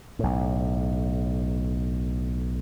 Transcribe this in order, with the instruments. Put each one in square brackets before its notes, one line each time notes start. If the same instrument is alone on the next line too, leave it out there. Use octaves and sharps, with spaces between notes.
[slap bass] B1 A2